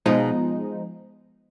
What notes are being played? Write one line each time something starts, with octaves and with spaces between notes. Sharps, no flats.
B2 F3 G#3 D#4